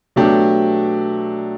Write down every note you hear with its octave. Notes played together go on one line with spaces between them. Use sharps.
B2 F#3 A3 D4 G4